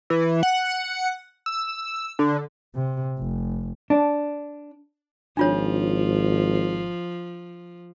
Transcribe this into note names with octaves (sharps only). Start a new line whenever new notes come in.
E3
F#5
E6
D3
C3
F1
D4
G#1 F3 D4 F4 C#5